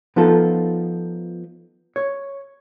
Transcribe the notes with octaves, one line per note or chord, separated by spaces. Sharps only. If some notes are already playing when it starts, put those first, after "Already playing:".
F3 B3 D#4 F4 A4
C#5